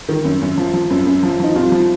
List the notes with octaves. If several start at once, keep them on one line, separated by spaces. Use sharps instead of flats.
D#3
F#2
F#2
F3
F3
F#2
F#2
F3
F3 D#4
C2 F4
F3